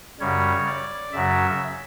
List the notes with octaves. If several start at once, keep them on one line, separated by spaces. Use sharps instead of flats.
F#2 C#3 G3 C#5
D5
F#2 C#3 F#3 E5